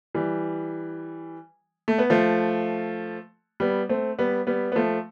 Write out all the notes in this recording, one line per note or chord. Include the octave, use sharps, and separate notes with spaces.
E3 G3
A3
B3
F3 A3
G3 B3
A3 C4
G3 B3
G3 B3
B3
F3 A3